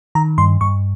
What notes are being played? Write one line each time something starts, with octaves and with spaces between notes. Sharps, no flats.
D#3 A#5
G2 C6
G2 C#6